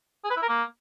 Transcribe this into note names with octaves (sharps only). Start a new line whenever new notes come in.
G#4
B4
E4
A#4
A#3